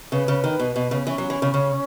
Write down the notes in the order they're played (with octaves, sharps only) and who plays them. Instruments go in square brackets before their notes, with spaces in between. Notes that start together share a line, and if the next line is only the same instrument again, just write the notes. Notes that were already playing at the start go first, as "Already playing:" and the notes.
[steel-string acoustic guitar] C#3 [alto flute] B4
[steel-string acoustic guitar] C#3
D#3
B2
B2
C#3
[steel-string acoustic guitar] E3 [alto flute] C#4
[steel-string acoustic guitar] F#3
E3
C#3
C#3